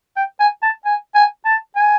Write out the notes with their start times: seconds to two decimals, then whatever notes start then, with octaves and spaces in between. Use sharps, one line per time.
0.16 G5
0.40 G#5
0.62 A5
0.85 G#5
1.15 G#5
1.45 A5
1.76 G#5